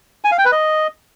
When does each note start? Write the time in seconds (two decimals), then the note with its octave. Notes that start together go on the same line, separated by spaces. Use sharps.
0.24 G#5
0.31 F5
0.38 G5
0.45 B4
0.52 D#5